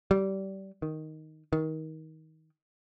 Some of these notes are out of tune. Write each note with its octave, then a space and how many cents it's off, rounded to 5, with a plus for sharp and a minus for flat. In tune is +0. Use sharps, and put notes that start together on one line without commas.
G3 -20
D#3 +5
D#3 +25